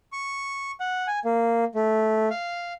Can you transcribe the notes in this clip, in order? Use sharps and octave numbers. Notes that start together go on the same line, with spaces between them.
C#6
F#5
G#5
A#3
A3
F5